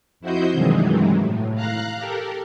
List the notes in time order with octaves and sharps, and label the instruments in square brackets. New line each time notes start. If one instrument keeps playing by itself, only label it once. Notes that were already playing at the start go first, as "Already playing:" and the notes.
[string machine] F2 E4 F#4 C5 D#5 G6
G2 C3 D#3 E3 F#3 G#3
A2
F5 A#5 F#6
G4 A4 A#4